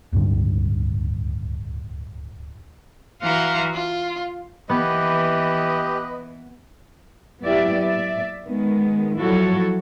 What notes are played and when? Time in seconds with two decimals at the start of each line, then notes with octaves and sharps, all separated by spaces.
0.13 D1 C#2 G2 D3
3.22 E3 F#4 F5 A#5 C6
3.74 F4
4.69 E3 B3 G4 B4 D#5
7.42 F#3 B3 E4 G4 D5 E5
7.81 D5 E5
8.45 D#3 G#3 B3
9.18 F3 F#3 E4 F#4 A4 C#5